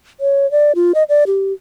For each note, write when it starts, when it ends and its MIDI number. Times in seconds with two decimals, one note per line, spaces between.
0.20 0.49 73
0.51 0.72 74
0.75 0.92 65
0.95 1.03 75
1.09 1.24 74
1.27 1.53 67